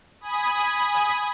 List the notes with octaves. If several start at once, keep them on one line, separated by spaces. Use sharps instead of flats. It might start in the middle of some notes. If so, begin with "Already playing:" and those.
G#5 B5 D#6